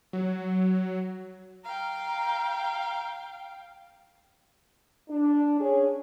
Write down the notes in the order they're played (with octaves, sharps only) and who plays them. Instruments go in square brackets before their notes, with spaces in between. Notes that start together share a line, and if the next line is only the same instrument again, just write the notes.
[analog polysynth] F#3
[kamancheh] F5 G5 [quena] A#5
[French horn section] D4
C#4 G#4 C#5